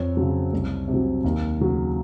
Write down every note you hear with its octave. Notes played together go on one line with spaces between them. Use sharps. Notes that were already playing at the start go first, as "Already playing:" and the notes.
Already playing: F2 C#5
C#3 F#3
C2
C3
F#3
D#2
C#3 F#3